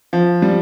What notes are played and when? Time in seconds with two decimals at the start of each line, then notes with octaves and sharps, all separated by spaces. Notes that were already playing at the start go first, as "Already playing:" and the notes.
0.13 F3
0.42 G3